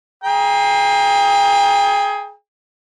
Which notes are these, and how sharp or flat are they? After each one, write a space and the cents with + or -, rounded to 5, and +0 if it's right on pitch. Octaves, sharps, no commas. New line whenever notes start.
G#4 +15 G5 +35 A#5 +20